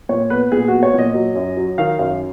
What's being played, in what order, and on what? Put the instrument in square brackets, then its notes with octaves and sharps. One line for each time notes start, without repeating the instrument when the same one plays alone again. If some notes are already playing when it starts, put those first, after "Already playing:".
[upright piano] A#2 C#5
B3 B4
A#2 G#4
B3 F#4
C#5
A#2 D#5
F#3
F#2
F#3
D#3 F5
F#2 F5